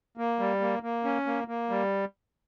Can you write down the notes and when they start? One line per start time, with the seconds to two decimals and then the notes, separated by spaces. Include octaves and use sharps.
0.17 A#3
0.39 G3
0.61 A#3
0.83 A#3
1.05 C#4
1.26 A#3
1.48 A#3
1.70 G3